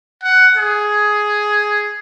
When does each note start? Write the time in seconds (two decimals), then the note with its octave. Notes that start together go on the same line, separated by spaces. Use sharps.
0.23 F#5
0.58 G#4